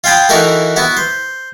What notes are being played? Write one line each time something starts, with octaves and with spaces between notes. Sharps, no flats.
F4 F5 G5 G#5 B5 D#6
E3 D#4 E4 F#4 A4 A#4
B3 E4 F#4
C5